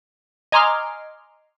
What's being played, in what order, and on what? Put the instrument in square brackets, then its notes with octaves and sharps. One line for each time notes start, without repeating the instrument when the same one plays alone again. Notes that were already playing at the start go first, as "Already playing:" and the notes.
[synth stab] D#5 G#5 A#5 C6 D6 F6